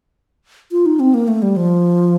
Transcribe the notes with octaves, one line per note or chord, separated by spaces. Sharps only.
F4
D#4
C4
A#3
A3
G3
F3